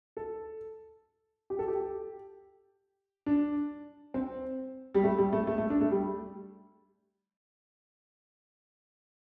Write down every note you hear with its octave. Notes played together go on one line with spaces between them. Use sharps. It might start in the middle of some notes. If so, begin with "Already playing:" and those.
A4
G4
A4
G4
D4
C4
G3
A3
G3
A3
A3
A3
D4
A3
G3